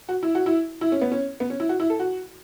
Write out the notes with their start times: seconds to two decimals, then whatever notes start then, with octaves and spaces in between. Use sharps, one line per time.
0.09 F#4
0.23 E4
0.35 F#4
0.46 E4
0.81 E4
0.92 C#4
1.01 B3
1.12 C#4
1.40 B3
1.50 C#4
1.60 E4
1.69 F#4
1.80 E4
1.90 A4
2.00 F#4